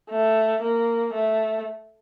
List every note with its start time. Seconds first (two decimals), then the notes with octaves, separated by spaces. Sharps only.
0.10 A3
0.62 A#3
1.13 A3